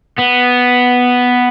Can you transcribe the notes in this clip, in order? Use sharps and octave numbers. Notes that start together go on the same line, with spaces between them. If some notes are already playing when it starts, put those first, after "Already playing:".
B3